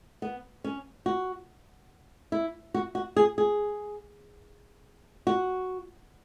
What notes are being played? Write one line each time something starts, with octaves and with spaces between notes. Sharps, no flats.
B3
C#4
F#4
E4
F#4
F#4
G#4
G#4
F#4